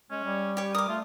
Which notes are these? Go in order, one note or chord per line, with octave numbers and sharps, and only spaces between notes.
G#3 C#4
G3
G4 C#5
A#4 D6 D#6
A3 F4